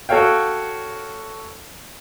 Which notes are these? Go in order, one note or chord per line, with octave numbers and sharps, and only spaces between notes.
F#4 A4 C#5 F5 G5